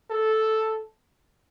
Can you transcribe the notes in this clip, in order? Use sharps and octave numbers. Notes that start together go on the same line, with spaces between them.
A4